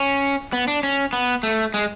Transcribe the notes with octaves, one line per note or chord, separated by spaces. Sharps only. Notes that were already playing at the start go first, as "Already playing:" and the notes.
Already playing: C#4
B3
D4
C#4
B3
A3
G#3